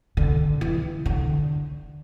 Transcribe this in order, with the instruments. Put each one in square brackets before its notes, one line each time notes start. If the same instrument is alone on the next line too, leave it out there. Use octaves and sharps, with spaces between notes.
[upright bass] D3
E3
D3